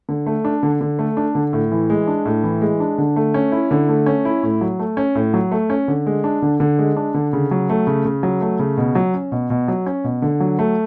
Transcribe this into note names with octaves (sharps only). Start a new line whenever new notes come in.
D3
A3
D4
D3
D3
A3
D4
D3
A2
E3
G#3
D4
A2
E3
G#3
D4
D3
A3
C#4
E4
D3
A3
C#4
E4
A2
F#3
A3
C#4
A2
F#3
A3
C#4
D3
G#3
D4
D3
D3
G#3
D4
D3
C#3
F#3
A3
C#3
C#3
F#3
A3
C#3
B2
F#3
C#4
B2
B2
F#3
C#4
B2
D3
F#3
A3